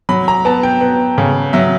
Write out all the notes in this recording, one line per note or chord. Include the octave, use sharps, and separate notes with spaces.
F#3 B5
A#5
B3 A5
G5
B3
C#3
F#3 E5